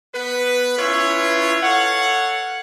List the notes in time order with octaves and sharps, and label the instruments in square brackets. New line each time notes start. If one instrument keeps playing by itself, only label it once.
[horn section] B3 B4
C#4 E4 F4 B4 C#5
A4 C#5 F5 F#5